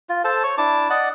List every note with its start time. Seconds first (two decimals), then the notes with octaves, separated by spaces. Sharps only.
0.09 F4
0.24 A4 C5 A5
0.44 C#5 C#6
0.58 D4 E4 A5 D6
0.90 D5 D#5 F#5